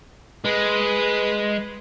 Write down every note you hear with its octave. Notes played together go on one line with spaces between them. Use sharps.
G#3 B4